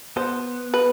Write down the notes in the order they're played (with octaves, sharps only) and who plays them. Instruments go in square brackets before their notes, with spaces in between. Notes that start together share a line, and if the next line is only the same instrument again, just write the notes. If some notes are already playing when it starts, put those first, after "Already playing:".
[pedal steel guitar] B3 [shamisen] C5
[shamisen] B4